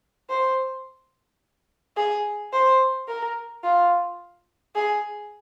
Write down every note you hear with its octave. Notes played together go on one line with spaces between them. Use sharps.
C5
G#4
C5
A#4
F4
G#4